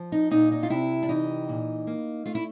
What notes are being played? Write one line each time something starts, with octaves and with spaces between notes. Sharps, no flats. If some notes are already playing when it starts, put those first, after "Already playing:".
Already playing: F3
D#4
A#2 D#4
D#4
F4
C3 E4
D4
E3 D#4
A#2
A#3
A3 F4
E4